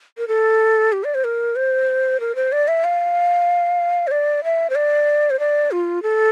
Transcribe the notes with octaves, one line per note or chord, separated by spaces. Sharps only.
A#4
A4
G4
D5
C5
A#4
C5
A#4
C5
D5
E5
F5
C5
D5
E5
C5
D5
C5
D5
F4
A4